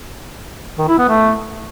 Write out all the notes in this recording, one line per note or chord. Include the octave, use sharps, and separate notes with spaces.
D#3
E4
B3
A3